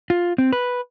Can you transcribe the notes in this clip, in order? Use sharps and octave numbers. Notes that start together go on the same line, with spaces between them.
F4
C4
B4